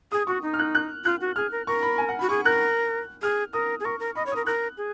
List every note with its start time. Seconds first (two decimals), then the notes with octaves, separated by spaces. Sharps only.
0.12 G#4 D#6
0.27 F#4 C#6
0.42 D#4
0.54 F6
0.59 F#6
0.75 F#6
1.05 F4 F#6
1.21 F#4
1.36 G#4 F6
1.52 A#4
1.67 A#4 C#6
1.82 B5
1.98 G#5
2.09 F#5
2.19 F#4 B5
2.29 G#4 C#6
2.45 A#4 F#6
3.22 G#4 F6
3.53 A#4 D#6
3.80 G#4
3.85 A#4 C#6
4.00 A#4
4.15 D#5 B5
4.26 C#5
4.31 A#4 D#6
4.46 A#4 F#6
4.77 G#4